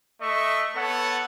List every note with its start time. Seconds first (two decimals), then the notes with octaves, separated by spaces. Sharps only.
0.21 A3 D#5 E5 C#6
0.76 B3 A4 C#5 F#5